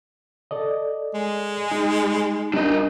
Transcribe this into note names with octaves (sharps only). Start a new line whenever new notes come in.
A4 D5 D#5
G#3
D#4
G3 D4 A#4 D#5